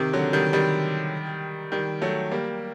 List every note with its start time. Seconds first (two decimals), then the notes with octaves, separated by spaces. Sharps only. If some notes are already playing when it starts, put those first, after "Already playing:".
Already playing: C3 D#3
0.13 D3 F#3
0.33 D#3 G3
0.53 D#3 G3
1.72 D#3 G3
2.02 F#3 A3
2.31 G3 A#3